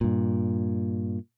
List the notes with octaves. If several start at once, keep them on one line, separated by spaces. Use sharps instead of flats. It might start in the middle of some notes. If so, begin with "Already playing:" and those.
G2 A#2